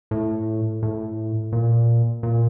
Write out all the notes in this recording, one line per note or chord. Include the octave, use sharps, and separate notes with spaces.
A2
A2
A#2
A#2